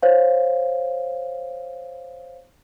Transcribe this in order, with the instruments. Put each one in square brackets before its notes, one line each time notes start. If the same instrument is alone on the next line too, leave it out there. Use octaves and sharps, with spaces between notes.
[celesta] C5 C#5 F5